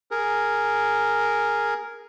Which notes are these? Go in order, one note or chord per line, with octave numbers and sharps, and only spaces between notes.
G#4 A#4